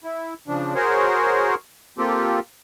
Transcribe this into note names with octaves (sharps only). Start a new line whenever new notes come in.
E4
C#3 F3 D4
F#4 G#4 A#4 C5 C#5
A#3 C4 F4 G4 A4